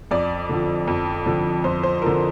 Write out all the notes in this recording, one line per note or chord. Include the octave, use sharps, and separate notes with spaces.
F2 D5
D3 F3
F2
D3 F3
F2 C5
C5
D3 F3 A#4